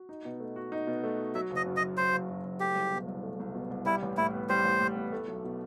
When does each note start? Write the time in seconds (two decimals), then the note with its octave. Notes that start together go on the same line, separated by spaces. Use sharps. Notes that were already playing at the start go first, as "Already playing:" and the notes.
Already playing: F#4
0.09 D#4
0.25 B2
0.40 A3
0.56 F#4
0.72 D#4
0.87 B2
1.04 A3
1.18 F#4
1.35 F#3 E5
1.51 F#1
1.56 D#5
1.66 F#2
1.76 D#5
1.81 F#1
1.97 F#3 C5
2.13 F#1
2.29 F#2
2.45 F#1
2.60 A3 G4
2.76 C2
2.93 B2
3.07 C2
3.23 A3
3.40 C2
3.55 B2
3.70 C2
3.86 G3 E4
4.03 A1
4.17 A2 E4
4.33 B3
4.49 G3 C5
4.65 A1
4.81 A2
4.96 B3
5.12 A3
5.28 B1
5.44 B2